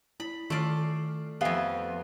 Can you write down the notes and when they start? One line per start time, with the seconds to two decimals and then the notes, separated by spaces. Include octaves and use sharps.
0.20 E4 B5
0.50 D#3 A3 F4 D5 F6 C7
1.41 F2 B3 G4 E5 F5 G5 G#5